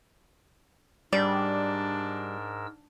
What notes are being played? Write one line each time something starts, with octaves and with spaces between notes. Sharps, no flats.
G#2 G3 D4 A#4 D5 E6